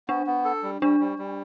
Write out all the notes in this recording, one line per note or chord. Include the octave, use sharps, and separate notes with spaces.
B3 D4
B3
A4
G3
G3 D4
G3
G3